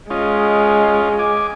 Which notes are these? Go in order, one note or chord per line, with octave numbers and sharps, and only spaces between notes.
G#3 C#4 F4 D#5
G#5 D6